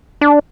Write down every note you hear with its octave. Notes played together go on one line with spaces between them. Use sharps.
D4